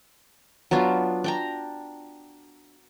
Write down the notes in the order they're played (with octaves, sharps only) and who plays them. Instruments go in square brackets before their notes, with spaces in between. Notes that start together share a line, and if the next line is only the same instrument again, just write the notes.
[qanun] F#3 B3 D4 F4
D4 G5 A#5